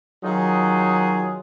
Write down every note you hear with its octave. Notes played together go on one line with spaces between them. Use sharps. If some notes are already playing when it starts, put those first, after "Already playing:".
D#3 F#3 D#4 F4 G#4